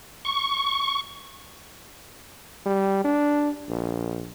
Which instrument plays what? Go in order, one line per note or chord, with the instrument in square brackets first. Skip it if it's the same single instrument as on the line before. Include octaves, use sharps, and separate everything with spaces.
[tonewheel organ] C#6
[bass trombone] G3
D4
A#1